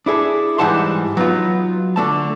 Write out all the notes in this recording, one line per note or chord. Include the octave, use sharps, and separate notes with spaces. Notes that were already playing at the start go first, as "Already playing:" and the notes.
D4 E4 G#4 A4
G#2 E3 G3 F#5 A5 C6
F#3 B3 D#4 F4
D3 A3 A5